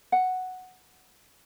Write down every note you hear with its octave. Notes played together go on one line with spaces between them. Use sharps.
F#5